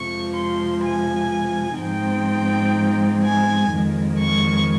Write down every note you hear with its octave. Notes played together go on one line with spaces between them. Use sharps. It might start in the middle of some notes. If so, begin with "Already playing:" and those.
Already playing: F2 C3 F3 G#3 C#6
C6
G#5
G#2 F3 C4 D#4 G5
G#5
F2 D#3 G#3
C#6